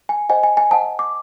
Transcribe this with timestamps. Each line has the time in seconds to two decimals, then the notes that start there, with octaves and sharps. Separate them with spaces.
0.09 G#5
0.29 C5 D#5 F#5 G#5
0.43 G#5
0.57 G#5
0.71 C5 D#5 F#5 A5
0.99 D6